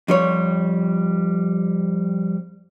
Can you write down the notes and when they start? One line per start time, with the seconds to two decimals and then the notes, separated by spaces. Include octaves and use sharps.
0.08 F2 G3 C#5